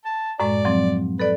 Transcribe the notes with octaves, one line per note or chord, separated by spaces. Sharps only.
A5
F#2 A2 G#3 D5
F3 F#3 C4
A4 B4 D5